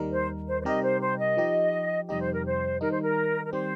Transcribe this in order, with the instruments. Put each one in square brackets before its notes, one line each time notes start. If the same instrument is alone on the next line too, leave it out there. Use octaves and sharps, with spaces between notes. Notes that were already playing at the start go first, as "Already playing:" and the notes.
Already playing: [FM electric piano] D#2 D#3 G3 D#4 A#4
[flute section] C5
C5
C5
[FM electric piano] C3 G3 D#4 G4 A#4 [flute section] D#5
[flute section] C5
C5
D#5
[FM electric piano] F3 D#4 G4
[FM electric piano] F2 C3 G3 D#4 G4 [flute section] D#5
[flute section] C5
A#4
C5
[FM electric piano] D#3 G3 D#4 [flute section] A#4
[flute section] C5
A#4
A#4
[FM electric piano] D#3 G3 C4 G4 [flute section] C5